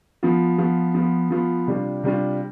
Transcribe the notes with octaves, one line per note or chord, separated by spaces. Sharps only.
F3 B3 F4
F3 B3 F4
F3 B3 F4
F3 B3 F4
C3 G3 D4 F4
C3 G3 D4 F4